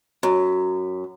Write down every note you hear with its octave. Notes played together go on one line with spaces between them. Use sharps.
F#2